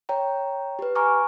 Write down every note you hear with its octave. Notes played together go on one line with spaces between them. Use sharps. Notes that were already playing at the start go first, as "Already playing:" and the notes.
C#5 G5 A#5
G4 B4
G#5 A#5 C#6 D6 F6